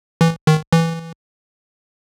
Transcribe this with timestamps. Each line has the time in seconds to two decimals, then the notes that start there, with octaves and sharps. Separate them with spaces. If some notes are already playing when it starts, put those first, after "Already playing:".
0.21 E3
0.47 D#3
0.73 E3